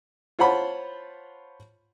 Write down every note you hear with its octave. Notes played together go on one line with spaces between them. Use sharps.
F4 C5 C#5 F#5 A5 B5